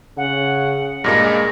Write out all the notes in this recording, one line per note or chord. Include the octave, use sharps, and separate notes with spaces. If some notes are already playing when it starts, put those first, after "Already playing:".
C#3 F#5
G2 A#2 G#3 A#3 A#6